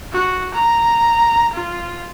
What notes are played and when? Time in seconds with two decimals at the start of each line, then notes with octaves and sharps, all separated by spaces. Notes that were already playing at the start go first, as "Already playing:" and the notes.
0.13 F#4
0.54 A#5
1.53 F4